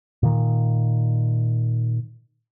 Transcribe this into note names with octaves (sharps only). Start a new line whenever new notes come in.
A#2 D#3